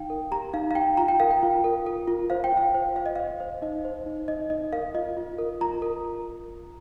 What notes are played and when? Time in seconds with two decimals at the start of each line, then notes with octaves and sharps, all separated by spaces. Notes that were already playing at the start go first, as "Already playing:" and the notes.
Already playing: D#4 F5 G5
0.10 A#4
0.31 G4 A#5
0.53 D#4 F5
0.71 F5
0.75 D#4 G5
0.97 F4 A#5
1.08 G5
1.20 A#4 F5
1.31 G5
1.43 F4
1.64 A#4
1.86 A#4
2.08 F4
2.30 C5 F5
2.44 G5
2.52 F4 F5
2.74 C5
2.96 C5 F5
3.06 D#5
3.15 C5 F5
3.40 C5
3.62 D#4 D#5
3.85 C5
4.06 D#4
4.28 D#4 D#5
4.50 D#4 D#5
4.73 A#4 F5
4.94 F4 D#5
5.17 F4
5.39 A#4
5.61 F4 A#5
5.82 A#4